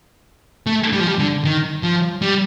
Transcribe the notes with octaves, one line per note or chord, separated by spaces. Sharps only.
A3
G3
F3
G3
D3
D#3
F3
G3